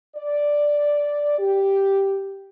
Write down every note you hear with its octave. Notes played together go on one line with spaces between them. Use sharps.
D5
G4